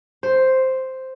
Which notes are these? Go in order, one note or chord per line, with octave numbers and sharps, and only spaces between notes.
C5